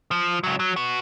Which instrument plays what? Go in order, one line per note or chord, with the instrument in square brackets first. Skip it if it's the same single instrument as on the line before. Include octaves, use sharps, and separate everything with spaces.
[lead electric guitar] F3
C#2 F#3
F#3
B3 F#4